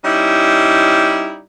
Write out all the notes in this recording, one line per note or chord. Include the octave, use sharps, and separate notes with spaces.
G3 C#4 D#4 E4